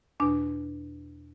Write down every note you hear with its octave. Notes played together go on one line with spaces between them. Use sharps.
E2 B2 D4